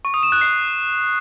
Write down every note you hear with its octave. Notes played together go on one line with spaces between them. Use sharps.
C#6
D#6
E7
F#6
C7